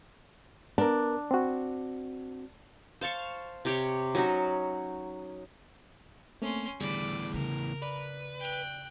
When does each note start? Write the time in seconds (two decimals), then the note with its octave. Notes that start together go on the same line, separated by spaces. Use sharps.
0.78 B3 D4 A#4
1.31 C4 F#4
3.01 C5 F5 A5 C#6
3.65 C3 G4 C#5
4.15 F#3 C#4 D#4 F#4
6.42 A3 A#3 C4 C#4 C6
6.81 E2 A2 D3 G3 G#4 D5 B5
7.34 C#3 A#4
7.82 B4 D5
8.39 G5 F#6